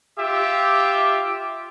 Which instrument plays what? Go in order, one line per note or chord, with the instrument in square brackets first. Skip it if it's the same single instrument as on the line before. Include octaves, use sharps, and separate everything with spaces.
[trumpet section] F4 G4 E5 D6